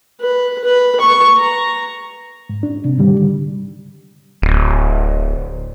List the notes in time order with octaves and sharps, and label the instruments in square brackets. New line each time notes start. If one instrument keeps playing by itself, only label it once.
[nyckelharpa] B4
B4
C#6
A#5
[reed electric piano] G#2
D4
C3
G#2 D3 D#3 G3
[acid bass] D1